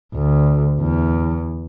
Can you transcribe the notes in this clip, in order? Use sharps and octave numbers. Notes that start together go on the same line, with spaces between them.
D2
E2